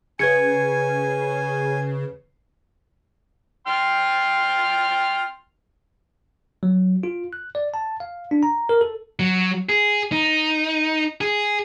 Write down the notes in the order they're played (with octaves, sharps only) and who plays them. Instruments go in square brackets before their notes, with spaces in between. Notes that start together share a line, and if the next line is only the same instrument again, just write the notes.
[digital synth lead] C#3 [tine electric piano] B4 G#6 C#7 [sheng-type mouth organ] G#5
[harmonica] G5 C6 F6
[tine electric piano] F#3
F4
F#6
D5
A5
F5
D4
A#5
A#4
A4
[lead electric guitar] F#3
G#4
D#4
G#4